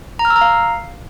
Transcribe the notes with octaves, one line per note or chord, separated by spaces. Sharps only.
A#5
F6
E6
A#5
F5